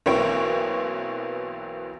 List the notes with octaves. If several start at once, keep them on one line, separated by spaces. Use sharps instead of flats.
B1 E3 A#3 C4 C#5 D7